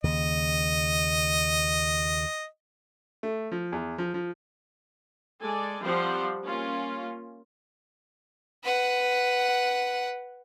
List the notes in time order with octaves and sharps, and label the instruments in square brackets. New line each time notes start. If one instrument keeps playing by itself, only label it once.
[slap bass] D#2 C#3 [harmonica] D#5
[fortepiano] A3
F3
E2
F3
F3
[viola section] G#3 A4 D5 G#5
F3 G3 C4 G4 C5 F#5
A#3 C#4 F4
[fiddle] B4 F#5